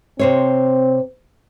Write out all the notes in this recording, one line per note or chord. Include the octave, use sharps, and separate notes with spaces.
C3 C4 C5 C#5